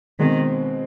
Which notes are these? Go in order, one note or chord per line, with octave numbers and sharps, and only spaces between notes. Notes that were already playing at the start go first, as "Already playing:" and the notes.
B2 D#3 G#3 C4